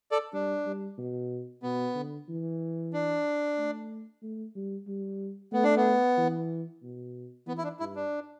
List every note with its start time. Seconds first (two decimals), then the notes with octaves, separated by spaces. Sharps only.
0.11 A4 D5
0.33 G3 D4
0.65 G3
0.98 B2
1.63 B2 B3
1.95 D3
2.28 E3
2.93 D4
3.58 A3
4.23 A3
4.55 G3
4.87 G3
5.52 A3 B3
5.63 D4
5.76 B3
6.18 E3
6.83 B2
7.47 E3 B3
7.58 E4
7.64 D4
7.80 G2 E4
7.95 D4